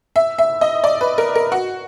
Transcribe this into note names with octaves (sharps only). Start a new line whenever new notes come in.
E5
E5
D#5
D5
B4
A#4
A#4
F#4